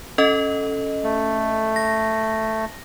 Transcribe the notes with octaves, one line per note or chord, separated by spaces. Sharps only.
C#4 A4 D#5
A3
A#6